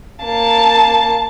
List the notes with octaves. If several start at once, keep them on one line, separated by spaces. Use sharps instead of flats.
A#3 A5